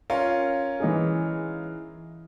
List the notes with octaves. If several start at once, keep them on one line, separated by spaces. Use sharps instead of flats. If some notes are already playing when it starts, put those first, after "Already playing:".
C#4 F4 A#4
E3 D#4 G#4